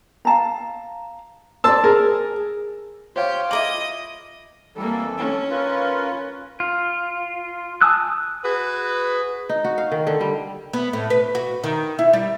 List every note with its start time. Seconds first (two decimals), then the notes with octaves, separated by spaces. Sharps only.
0.25 F5 A5 A#5
1.64 C5 D5 A5 E6
1.84 G#4 A#4
3.16 F4 G4 C5 C#5 F5
3.51 E4 A#4 D#5 D6 D#6 F#7
4.76 F2 E3 G3 A#3 A4
5.17 C#4
5.50 F4 A#4 B4
6.60 F4
7.81 G#5 A5 D#6 E6 F#6
8.45 F#4 G#4 B4
9.49 D#4
9.64 F#4
9.78 F5
9.92 D#3
10.07 D3
10.21 G3
10.73 B3
10.93 A2
11.10 B4
11.35 F#4
11.64 D#3
11.99 E4
12.13 G3